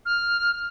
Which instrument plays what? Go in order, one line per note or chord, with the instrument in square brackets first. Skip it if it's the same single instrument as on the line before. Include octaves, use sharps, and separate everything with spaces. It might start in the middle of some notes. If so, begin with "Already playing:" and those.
[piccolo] F6